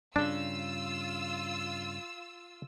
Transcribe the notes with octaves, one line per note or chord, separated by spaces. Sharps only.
G2 C#3 D4 F4 E6